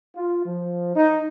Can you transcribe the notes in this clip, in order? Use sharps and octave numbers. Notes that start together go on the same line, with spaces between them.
F4
F3
D#4